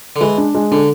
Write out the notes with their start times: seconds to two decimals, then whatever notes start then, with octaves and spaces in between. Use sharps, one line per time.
0.16 D3
0.21 E3 G#3
0.38 D4
0.55 G#3
0.71 D3 D4